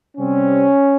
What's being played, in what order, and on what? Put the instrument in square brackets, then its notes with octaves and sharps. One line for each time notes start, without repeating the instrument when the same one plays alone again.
[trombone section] C3 G3 C4 C#4